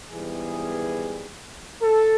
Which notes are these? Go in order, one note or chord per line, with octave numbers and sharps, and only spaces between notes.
G#2 E3 G3 B3 G#4
A4